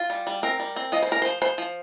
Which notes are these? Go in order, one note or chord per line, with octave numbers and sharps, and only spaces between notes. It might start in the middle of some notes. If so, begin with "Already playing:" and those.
Already playing: F4
G3
G3
C4 A#4
G3
C4
F3 D#5
C5
F3 A#4
F3 C5
F3 C5
F3